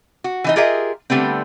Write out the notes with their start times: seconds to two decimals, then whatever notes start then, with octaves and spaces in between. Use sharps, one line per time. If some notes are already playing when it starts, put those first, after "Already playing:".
0.24 F#4
0.44 E3 D#4 D#5
0.56 F4 G4 G#4 A#4 D#5 E5
1.10 D3 G3 A3 B3 C4